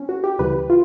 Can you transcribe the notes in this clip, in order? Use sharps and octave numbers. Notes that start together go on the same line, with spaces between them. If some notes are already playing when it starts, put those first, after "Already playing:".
Already playing: C4 C#4
F#4
G4
D2 C#3 E3 G3 B4
F4